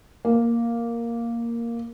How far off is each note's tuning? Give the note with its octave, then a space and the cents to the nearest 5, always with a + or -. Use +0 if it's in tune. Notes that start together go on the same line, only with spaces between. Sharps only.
A#3 +0